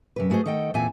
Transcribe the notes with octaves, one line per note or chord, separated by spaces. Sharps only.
F#2 C3 B4
G#3 A3 F#4 G#4 C5
D#3 A4 D#5 F#5 G5
E2 A#2 C4 A4 E5 G#5